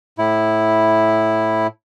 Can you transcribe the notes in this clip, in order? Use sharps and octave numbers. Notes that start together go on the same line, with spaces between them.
A2 E4